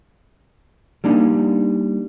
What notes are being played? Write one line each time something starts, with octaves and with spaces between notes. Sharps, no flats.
G3 A#3 D4 D#4